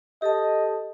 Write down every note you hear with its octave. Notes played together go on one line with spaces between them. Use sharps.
G4 A4 D#5 A5